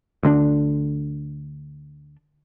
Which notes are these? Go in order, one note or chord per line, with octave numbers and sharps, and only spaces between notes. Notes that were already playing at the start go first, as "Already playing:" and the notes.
D2 D3 C#4 D4